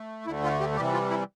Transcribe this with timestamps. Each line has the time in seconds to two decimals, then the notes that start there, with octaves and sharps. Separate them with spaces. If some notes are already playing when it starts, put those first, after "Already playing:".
Already playing: A3
0.27 D2 D3 A3 E4
0.44 F4
0.60 G4
0.76 C3 E3 G3 G4
0.94 F4
1.10 E4